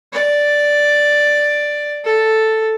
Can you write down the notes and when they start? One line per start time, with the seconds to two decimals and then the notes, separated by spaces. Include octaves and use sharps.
0.13 D5
2.05 A4